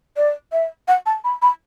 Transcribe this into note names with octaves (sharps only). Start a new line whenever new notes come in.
D5
E5
F#5
A5
B5
B5